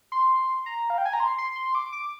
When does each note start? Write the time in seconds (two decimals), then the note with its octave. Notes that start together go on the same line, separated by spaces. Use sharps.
0.12 C6
0.66 A#5
0.90 F5
0.98 G5
1.05 G#5
1.13 A#5
1.20 C6
1.38 C6
1.56 C6
1.75 D6
1.93 D6